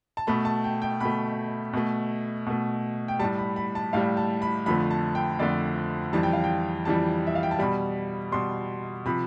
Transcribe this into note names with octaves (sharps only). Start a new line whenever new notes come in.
A5
B2 A3 B5
A5
G5
G5
B2 A3 B5
B2 A3
B2 A3
G5
A2 G3 A5
B5
B5
A5
A2 G3 F5
A5
B5
F2 D3 F3 A3 B5
A5
G5
F2 D3 F3 A3 D5
F2 E3 G3 A5
G5
F5
G5
F2 E3 G3 A5
E5
F5
G5
A5
B2 G3 B5
B2 G3 C6
C3 F3 B5